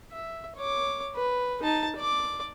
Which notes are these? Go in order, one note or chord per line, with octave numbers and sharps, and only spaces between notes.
E5
C#5 D6
B4
D#4 A5
D5 D6